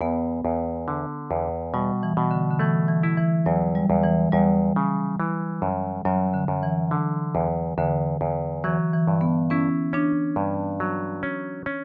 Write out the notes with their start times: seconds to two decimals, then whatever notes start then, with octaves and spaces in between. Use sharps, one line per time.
0.01 E2 B3
0.45 E2
0.88 D3
1.31 E2
1.74 B2 G3
2.03 E3
2.17 B2
2.31 D3
2.51 D3
2.59 E3 A3
2.89 E3
3.03 E4
3.17 E3
3.46 E2 F#3
3.75 G3
3.90 E2
4.03 E3
4.32 E2 G3
4.76 C#3
5.20 E3
5.62 F#2
6.05 F#2 F#3
6.34 D3
6.48 F#2
6.63 E3
6.91 D3
7.35 E2
7.78 E2 D3
8.21 E2
8.64 E3 F#3
8.94 E3
9.08 G2
9.21 B3
9.50 C#4 E4
9.93 C#4 D4
10.36 G2
10.80 F#3
11.23 C#4
11.66 C#4